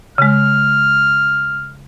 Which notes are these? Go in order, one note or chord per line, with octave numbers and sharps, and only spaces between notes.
C#3 G#3 F6